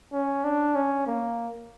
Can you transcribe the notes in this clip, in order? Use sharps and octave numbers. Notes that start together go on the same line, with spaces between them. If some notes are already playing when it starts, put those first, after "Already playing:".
C#4
D4
C#4
A#3